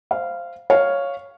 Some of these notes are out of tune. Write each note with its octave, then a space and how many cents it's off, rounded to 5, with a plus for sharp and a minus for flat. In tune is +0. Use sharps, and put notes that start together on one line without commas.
C5 +0 F5 -15
C#5 +0 F5 +0